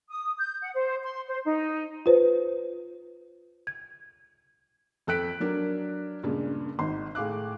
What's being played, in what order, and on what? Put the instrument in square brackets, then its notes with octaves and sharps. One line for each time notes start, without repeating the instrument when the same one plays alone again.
[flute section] D#6
G6
F#5
C5
C6
C5
D#4
[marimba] F4 B4 C5
G#6
[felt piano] F2 A4 G5 F#6 B6 D7
F#3 D4 A#4
G2 A#2 C#3 G#3
G#1 D#4 C6
A2 G#4 F5 D6 F#6